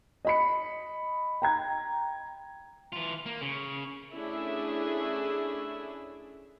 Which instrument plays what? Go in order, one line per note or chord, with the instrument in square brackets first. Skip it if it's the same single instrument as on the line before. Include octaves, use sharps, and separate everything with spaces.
[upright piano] D#5 B5 C#7
G5 A#5 G#6
[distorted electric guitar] E3 F4
A#3
C#3
[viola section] A3 C#4 D4 E4 G#4 E5